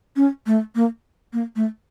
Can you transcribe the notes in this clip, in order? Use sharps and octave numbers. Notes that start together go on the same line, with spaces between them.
C#4
A3
A#3
A#3
A3